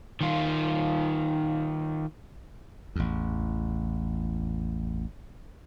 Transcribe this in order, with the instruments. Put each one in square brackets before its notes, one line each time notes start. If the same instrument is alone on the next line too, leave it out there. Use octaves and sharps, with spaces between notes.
[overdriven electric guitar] D#3 F4
[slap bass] A1 E2